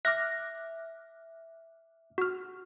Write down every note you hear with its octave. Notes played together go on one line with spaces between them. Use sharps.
E5 D6 F6 F#6 A#6
F#4 F6